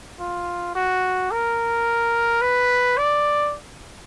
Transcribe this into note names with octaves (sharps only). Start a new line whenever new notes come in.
F4
F#4
A#4
B4
D5